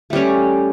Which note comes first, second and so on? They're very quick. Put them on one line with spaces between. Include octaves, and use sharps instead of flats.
A3 G3 C#4